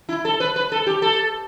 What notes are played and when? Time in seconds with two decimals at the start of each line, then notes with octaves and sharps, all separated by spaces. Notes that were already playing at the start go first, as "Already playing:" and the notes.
0.09 E4
0.25 A4
0.40 B4
0.56 B4
0.72 A4
0.86 G4
1.02 A4